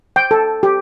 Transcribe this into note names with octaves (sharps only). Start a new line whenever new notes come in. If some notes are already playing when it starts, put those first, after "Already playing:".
G5
A4
G4